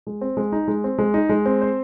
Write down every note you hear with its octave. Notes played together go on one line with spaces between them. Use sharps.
G#3
C4
G#3
D#4
G#3
C4
G#3
D#4
G#3
C4
C5